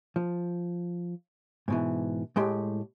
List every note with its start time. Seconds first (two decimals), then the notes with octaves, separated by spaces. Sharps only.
0.16 F3
1.68 G#2 B2 E3
2.36 A2 G#3 G4 C6